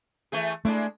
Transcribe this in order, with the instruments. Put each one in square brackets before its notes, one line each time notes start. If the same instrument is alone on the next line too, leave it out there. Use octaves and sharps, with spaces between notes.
[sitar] E3 A3 G#4
[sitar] G#3 D4 E4 [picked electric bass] A3